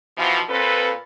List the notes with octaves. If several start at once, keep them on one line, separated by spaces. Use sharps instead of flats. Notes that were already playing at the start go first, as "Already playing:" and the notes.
B2 E3 F3
A#2 C4 A4 B4